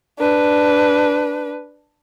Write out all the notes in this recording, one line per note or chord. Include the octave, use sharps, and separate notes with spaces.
D4 B4